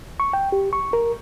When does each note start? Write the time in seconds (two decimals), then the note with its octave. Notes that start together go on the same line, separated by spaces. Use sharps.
0.20 C#6
0.33 G5
0.52 G4
0.73 C#6
0.93 A#4